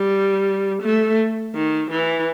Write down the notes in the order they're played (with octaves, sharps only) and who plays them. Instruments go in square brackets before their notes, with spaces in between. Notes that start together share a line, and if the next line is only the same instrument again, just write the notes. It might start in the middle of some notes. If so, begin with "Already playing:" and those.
Already playing: [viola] G3
A3
D#3
E3